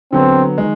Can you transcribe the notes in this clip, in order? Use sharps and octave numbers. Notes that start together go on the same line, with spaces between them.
D3 F#3 B3 C4
D#3 G#3